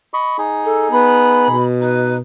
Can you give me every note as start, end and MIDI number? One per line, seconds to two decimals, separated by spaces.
0.14 0.37 75
0.14 0.37 83
0.14 0.37 85
0.38 1.56 63
0.38 1.56 68
0.64 0.90 69
0.91 1.49 59
0.91 1.63 83
1.50 2.20 47
1.81 2.18 63
1.81 2.15 71